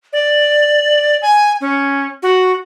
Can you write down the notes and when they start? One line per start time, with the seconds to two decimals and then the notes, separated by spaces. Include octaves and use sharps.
0.13 D5
1.22 G#5
1.61 C#4
2.23 F#4